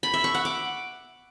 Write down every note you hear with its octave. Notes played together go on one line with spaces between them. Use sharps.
B5
E5
C#6
F#5
D6